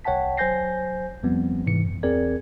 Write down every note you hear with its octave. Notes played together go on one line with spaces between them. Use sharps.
C2 C#5 F#5 G5 A5 B6
F#3 C5 G#5 G6 A#6 C7
F2 F3 G3 B3 C4
G#2 C3 E3 C#7
F#2
E2 C4 G#4 A#4 D5 G#6